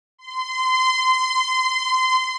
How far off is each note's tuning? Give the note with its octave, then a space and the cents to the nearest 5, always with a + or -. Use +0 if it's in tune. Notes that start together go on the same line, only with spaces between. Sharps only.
C6 -25